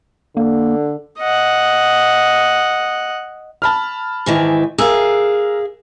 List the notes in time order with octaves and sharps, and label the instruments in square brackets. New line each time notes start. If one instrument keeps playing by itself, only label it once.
[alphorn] D3 [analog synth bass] A#3
[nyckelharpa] D#5 F#5
[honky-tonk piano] A5 B5 F6
[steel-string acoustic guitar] G#2 D#3 E3
[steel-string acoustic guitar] G#4 F5 [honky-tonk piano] A#4 E6